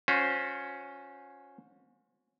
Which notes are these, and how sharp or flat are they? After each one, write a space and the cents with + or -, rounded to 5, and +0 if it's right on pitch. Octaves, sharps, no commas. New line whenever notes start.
C#4 +0 F#4 -45 C5 +0